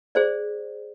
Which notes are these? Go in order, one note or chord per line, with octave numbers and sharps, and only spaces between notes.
G#4 C5 D5